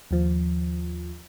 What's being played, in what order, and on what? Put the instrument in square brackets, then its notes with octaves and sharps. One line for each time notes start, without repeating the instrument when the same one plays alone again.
[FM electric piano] D#2 F3